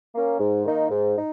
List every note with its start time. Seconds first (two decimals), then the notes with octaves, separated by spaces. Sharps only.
0.15 A#3 C#4
0.40 G#2
0.66 D#3 A#3 D#4
0.90 G#2
1.16 D#4